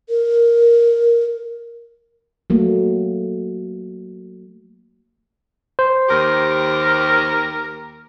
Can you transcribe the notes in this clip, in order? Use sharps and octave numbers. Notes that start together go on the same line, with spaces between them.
A#4
F#3 A3 A#3
C5
D#2 G4 A#4